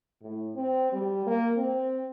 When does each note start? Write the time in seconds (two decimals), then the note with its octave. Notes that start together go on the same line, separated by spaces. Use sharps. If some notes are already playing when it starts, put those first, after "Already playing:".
0.21 A2
0.56 C4
0.92 G3
1.26 A#3
1.57 C4